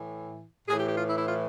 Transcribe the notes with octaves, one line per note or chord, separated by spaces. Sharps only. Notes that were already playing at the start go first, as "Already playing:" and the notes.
Already playing: A2 E3
A2 E3 G#4
G4
G4
F4
E4
E4
F4